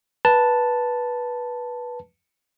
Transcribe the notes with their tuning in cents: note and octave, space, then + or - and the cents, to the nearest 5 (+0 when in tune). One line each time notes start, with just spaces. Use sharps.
B4 -15 A5 +0